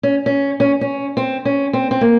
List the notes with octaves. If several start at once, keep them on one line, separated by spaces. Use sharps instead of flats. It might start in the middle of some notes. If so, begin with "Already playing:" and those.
C#4
C#4
C#4
C#4
C4
C#4
C4
C4
A#3